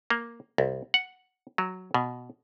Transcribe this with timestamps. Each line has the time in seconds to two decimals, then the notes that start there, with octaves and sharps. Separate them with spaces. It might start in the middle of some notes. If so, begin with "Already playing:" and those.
0.10 A#3
0.58 C2
0.94 F#5
1.58 F#3
1.94 B2